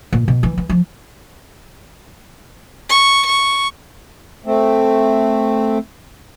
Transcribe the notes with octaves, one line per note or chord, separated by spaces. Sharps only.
A#2
B2
E3
E3
F3
C#6
C#6
A3 C4